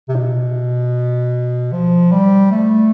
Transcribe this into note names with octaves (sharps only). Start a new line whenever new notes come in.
C3
B2
F3
G3
A3